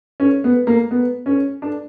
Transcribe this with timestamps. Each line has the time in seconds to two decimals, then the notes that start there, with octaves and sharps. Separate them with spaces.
0.20 C#4
0.44 B3
0.67 A#3
0.91 B3
1.26 C#4
1.62 D4